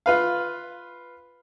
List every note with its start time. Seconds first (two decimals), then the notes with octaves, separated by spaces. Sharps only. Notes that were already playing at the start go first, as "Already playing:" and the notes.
0.06 F4 B4 F5